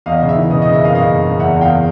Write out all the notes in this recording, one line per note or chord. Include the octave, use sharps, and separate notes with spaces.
E2 D#5 F5
C#3
E5
E3
C#3 D#5
C#3 D#5
E5
F#1 D#5 F5
C#3 D#5 F5
F#1
C#3
E2 E5 F#5
E2
F5 G5